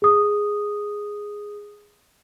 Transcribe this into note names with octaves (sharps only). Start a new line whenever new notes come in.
G#4 D#6